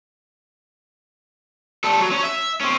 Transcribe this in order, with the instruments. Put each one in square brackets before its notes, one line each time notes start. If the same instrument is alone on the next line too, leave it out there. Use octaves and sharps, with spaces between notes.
[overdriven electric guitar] G3 A4
F#3
C#4
E5
C4 C#4